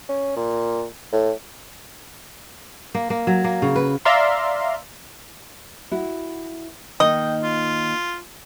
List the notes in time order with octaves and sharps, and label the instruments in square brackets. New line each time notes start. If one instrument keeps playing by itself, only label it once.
[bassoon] C#4
A#2
A2
[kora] A#3
A#3
F#3
A#3
C#3
B4
[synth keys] D5 E5 F5 A#5 C6
[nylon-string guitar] E4 F#4
[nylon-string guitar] D#3 A#3 D#4 [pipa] D#5 [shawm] G5
[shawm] F4